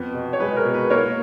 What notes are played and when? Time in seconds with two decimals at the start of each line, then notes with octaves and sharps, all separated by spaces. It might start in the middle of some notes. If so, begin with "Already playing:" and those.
Already playing: F2 B3
0.14 B2
0.33 C#5
0.40 G#3 B4
0.56 A#4
0.65 B2
0.74 B4
0.90 A#3 A#4 C#5